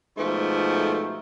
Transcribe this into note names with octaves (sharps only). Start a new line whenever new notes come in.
G#2 B2 F3 A3